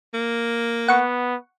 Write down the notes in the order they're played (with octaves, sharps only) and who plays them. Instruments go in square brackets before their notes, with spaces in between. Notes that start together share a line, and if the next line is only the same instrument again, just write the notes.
[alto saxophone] A#3
[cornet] B3 [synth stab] F#5 C#6